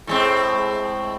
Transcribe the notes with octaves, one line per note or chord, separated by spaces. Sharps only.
A2 G#3 C4